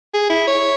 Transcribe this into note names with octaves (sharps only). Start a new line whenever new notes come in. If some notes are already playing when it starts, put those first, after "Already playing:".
G#4
E4
C#5